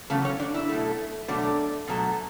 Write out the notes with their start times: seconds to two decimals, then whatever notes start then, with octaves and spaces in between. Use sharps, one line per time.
0.10 E2 C#3 F#3 A3 A4
0.25 C#4 C#5
0.39 D4 D5
0.54 E4 E5
0.69 B2 F#3 A3
1.28 B2 F#3 A3 D4 D5
1.88 B2 F#3 A3